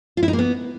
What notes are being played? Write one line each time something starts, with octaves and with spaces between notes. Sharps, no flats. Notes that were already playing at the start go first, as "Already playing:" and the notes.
F4
E4
D#4
A#3
B3